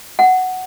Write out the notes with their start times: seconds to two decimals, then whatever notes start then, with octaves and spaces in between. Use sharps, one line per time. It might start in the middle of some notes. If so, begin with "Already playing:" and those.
0.19 F#5